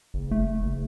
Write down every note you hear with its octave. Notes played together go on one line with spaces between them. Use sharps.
F#1
A3
F#1